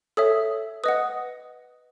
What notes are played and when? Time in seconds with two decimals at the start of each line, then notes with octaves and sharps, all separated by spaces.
0.17 A4 C#5 E5 D#6
0.84 B4 D#5 F#5 D#6